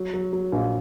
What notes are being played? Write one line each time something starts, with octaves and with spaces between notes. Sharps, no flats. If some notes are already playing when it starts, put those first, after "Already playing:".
Already playing: F#3
F#3
F#3
A#1